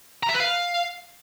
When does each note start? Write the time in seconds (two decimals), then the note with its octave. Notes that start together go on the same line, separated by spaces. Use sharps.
0.23 A#5
0.29 E5
0.34 B4
0.40 F5